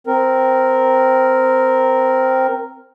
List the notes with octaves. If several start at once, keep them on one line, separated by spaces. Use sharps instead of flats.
C4 A#4